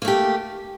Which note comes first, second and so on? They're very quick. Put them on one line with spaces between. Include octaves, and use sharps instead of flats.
A#3 A3 G4